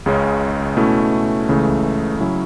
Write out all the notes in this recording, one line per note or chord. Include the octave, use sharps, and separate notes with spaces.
C#2 C#3 G#3 C#4
B2 A3 C#4 E4
C#2 C#3 E3 A3
C#3 F#3 C#4 E4